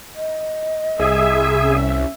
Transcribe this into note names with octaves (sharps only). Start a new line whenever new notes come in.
D#5
C2 G#4 E5
C#4